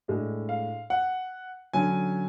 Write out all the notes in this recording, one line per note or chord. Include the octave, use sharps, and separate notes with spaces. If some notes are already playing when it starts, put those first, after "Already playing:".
A2 G#3 D4
F5
F#5
D3 F#3 C#4 G#5